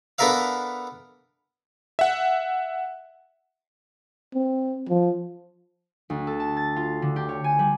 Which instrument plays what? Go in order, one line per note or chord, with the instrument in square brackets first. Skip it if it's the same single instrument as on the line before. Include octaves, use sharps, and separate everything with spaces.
[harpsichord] B3 D4 A4 A#4 E5 F5
[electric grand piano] E5 F#5
[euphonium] C4
F3
[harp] D2
A4
A5
A6
F4
D3
G4
C#5
G#5
G3